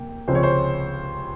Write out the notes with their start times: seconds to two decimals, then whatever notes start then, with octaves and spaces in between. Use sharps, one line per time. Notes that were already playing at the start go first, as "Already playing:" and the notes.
Already playing: C3 A#3 G5
0.28 C#2 C3 F3 G#3 C#4 C5
0.35 C#5
0.43 C5